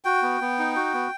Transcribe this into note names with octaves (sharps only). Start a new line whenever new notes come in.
F#4 G5
B3
B3
D#4
F#4
B3